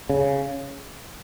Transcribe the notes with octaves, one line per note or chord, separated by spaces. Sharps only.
C#3